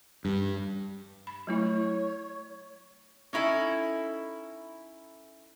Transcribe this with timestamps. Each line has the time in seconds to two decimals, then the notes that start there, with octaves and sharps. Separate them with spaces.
0.25 G2
1.27 B5
1.47 F#3 A3 E4 C#5
3.33 C#4 D#4 E4 A4